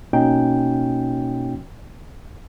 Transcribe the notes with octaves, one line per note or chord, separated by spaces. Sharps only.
B2 A#3 C#4 D#4 F#4 G5